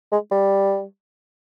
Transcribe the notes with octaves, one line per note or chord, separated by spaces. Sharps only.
G#3
G3